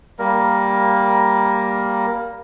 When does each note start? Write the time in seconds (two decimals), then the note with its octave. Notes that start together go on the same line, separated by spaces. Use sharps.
0.19 G3 A#3 A#4